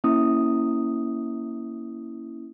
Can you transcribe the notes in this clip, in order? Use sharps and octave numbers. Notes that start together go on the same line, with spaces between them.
A#3 C#4 E4 D#6